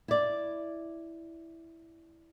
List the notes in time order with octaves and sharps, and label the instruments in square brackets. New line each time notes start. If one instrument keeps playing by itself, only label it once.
[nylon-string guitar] E4 D5